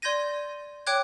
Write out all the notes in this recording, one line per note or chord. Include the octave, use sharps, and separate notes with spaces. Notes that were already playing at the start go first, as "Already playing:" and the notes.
D5 C6 G6 G#6 A#6 D#7
C#5 G5 D6 F#6 G#6